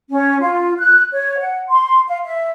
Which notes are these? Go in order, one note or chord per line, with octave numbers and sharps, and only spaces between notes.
C#4
F4
F#6
C#5
F#5
C6
F5
E5